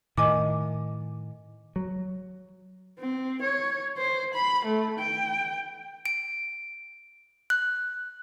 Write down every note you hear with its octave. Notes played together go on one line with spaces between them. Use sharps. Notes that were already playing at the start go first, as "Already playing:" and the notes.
A2 D#3 D#5 G#5 D6
F#3
C4
C#5
C5
B5
A3
G5
D7
F#6